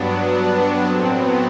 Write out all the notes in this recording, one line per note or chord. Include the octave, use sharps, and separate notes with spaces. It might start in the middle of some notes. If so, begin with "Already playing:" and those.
Already playing: G2 F#3 B3 D4
B3 D4
A2 F#3 C4
B3